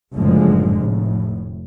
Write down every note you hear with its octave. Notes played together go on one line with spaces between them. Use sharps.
F#1 A2 D3 F3 G#3
F1 A2